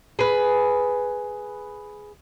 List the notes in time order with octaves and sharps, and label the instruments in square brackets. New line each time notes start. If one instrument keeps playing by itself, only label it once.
[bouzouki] G#4 B4